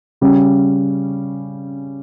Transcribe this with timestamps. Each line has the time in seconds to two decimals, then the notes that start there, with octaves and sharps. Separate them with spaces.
0.21 C#3 G3 C#4